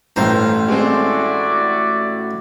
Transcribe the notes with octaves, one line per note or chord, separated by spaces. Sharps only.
A1 G2 E3 C5 A#5
G#3 A3 C4 E4 F#4 D5